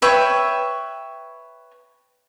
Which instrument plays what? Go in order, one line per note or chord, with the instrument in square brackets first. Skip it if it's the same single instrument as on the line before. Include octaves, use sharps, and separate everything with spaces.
[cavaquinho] B4 C#5 E5 G5